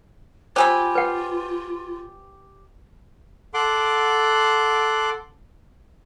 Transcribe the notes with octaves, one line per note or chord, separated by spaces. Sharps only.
F4 G4 C5 G#5 B5 E6
B4 F#5
A4 F#5 C6 D6